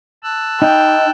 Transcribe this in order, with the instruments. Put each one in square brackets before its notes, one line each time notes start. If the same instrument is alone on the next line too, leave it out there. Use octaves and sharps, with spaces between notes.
[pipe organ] A5 E6 F#6
[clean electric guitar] D#4 [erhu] G5